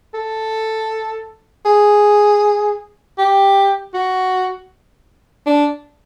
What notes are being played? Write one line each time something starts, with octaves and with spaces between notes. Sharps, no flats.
A4
G#4
G4
F#4
D4